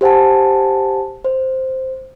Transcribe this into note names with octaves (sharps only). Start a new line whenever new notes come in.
G4 C5 F#5 G#5 A5
C5